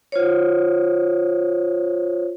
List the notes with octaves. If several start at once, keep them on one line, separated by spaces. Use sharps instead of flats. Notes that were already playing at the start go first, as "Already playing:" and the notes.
F4 C5 C#5